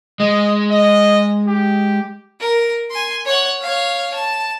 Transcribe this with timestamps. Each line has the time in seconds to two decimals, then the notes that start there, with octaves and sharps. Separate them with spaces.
0.20 G#3 D#5
0.71 D#5
1.48 G4
2.40 A#4
2.91 G#5 C6
3.25 C#5 F#5
3.62 C#5 F5
4.14 A5